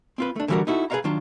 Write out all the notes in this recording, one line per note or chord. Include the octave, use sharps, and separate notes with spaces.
C4 F4 B4
A3 D4
D3 E3 G3 F4 F#4 A#4
D#4 E4 F#4 A4
G#4 B4 C#5 D5 F5 A#5
D#3 F#3 D4 F4